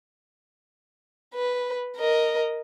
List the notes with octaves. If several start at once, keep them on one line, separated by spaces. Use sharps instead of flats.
B4
A#4 D#5